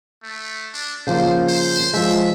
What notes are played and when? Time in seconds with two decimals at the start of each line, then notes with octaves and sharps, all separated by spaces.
0.23 A3
0.74 D4
1.07 C#3 F3 A#3 C5
1.49 C5
1.93 F3 G#3 E5